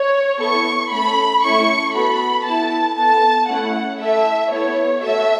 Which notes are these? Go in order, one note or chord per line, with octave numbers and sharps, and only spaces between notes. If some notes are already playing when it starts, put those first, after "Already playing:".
Already playing: C#5
B3 E4 A4 C#6
A3 C#4 A4 B5
A3 C#4 E4 A4 C#6
B3 F#4 A4 B5
B3 E4 A4 A5
B3 A4 A5
A3 C#4 E4 F#5
A3 E4 A4 E5
B3 E4 A4 C#5
A3 F#4 A4 E5